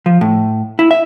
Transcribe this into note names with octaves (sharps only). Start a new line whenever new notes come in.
F3
A2
E4
E5